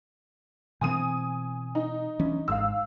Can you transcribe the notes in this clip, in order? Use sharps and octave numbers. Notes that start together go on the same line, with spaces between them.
B2 E3 C4 G#5 D#6 D#7
D#4
E3 C#4 D4
G#1 G#2 F5 E6